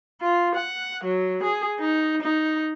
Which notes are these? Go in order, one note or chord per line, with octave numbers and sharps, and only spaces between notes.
F4
F#5
F#3
G#4
D#4
D#4